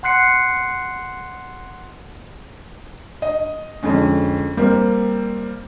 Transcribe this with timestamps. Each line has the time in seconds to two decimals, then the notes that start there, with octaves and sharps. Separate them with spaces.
0.03 F#5 C6 F#6 C7 C#7
3.22 D#5
3.83 F2 D3 G#3 C#4
4.57 G3 A#3 C4